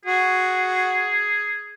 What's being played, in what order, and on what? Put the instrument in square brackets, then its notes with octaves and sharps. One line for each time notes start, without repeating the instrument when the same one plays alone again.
[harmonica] F#4 [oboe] G#4